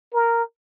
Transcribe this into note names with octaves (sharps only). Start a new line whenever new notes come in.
A#4